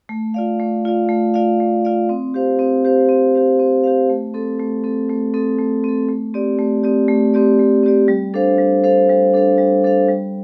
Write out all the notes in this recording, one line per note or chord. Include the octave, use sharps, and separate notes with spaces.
A3
F4 D5 F5
A3
F4 D5 F5
A3
F4 D5 F5
A3
F4 D5 F5
C4
G4 C5 F5
C4
G4 C5 F5
C4
G4 C5 F5
C4
G4 C5 F5
A3
C4 A4
A3
C4 A4
A3
C4 A4
A3
C4 A4
A3
C4 G4 D5
A3
C4 G4 D5
A3
C4 G4 D5
A3
C4 G4 D5
G3
D4 A4 C5 F5
G3
D4 A4 C5 F5
G3
D4 A4 C5 F5
G3
D4 A4 C5 F5
G3